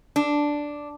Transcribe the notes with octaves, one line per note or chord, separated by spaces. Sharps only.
D4